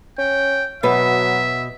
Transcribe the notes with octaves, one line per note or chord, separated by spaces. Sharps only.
C#4 G5
B2 F#3 B4 E5